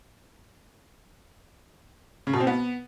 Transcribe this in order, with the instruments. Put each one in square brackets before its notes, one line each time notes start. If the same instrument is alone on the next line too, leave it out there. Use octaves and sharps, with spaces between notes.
[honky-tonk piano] C#3
B2
C4
B3